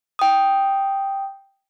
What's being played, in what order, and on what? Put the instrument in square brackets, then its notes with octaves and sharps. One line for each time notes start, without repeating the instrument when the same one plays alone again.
[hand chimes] G5 D#6